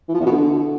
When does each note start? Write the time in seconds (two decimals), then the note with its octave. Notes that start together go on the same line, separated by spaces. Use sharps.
0.08 E3
0.14 F3
0.20 E2
0.26 B2
0.32 D3